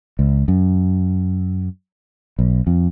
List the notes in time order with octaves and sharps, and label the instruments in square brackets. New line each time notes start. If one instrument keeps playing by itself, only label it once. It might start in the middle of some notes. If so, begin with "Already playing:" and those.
[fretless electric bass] C#2
F#2
B1
F2